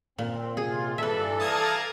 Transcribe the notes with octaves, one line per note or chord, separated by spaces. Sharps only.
A#2 C4
C3 F4 G#4
G2 E3 D4 A4 B4 E5
D5 F5 A5 A#5 D#6 G#6